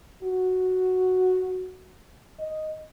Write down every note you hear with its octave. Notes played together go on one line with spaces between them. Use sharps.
F#4
D#5